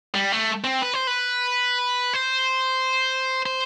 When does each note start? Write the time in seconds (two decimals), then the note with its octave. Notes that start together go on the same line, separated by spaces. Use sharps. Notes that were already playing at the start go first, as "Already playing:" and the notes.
0.15 G3
0.32 A3
0.64 C4
0.82 B4
0.94 C5
1.07 B4
2.14 C5
3.46 C5